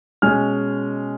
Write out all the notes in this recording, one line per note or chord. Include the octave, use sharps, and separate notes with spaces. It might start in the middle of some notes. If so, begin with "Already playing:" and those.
B2 G#3 C#4 F6